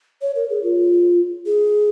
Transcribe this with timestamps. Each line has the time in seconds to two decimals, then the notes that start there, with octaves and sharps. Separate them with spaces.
0.22 C#5
0.36 A#4
0.50 G#4
0.63 F4
1.46 G#4